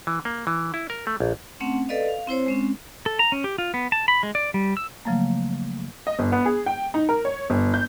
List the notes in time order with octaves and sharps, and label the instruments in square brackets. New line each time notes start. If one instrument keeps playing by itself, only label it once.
[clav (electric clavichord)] E3
A#3
E3
E4
A#4
A3
A#1
[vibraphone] A3 C4 C#4 F#5
A4 B4 D5 D#5 F5
F5
C4 E4 C5 C#5
G#3 C4 C#4
[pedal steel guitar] A4
A#5
C#4
G4
F4
B3
A5
B5
G#3
D5
G3
E6
[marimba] C#3 F3 F#3 A3 A#3
[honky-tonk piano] D#5
G1
B3
G#4
G5
D#4
A#4
C#5
G1
G6